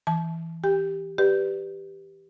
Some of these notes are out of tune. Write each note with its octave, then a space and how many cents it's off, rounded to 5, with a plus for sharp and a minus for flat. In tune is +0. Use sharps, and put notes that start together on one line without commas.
E3 +0 A5 -30
G4 +0 G5 +40
G4 +0 B4 +0 D5 +0